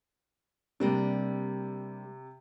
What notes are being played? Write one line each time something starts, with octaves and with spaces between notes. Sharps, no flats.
C3 G3 A#3 D4